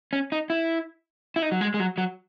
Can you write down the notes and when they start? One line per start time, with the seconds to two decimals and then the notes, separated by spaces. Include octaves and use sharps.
0.13 C#4
0.32 D#4
0.50 E4
1.36 E4
1.42 D#4
1.52 F#3
1.61 G#3
1.74 G#3
1.80 F#3
1.98 F#3